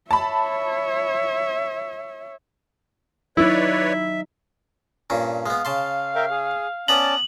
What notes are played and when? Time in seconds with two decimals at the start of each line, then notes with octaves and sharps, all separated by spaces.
0.11 C#5 E5 A5 B5
3.37 F#3 D#4 E4 B4 C#5 D5 E5
5.10 G2 A#2 C#4
5.46 G#3 B3 F5
5.65 C#3 A5 C6
6.15 A#4 E5 G5
6.31 G#4
6.88 B3 C#4 B4 D5 A5 A#5 F#7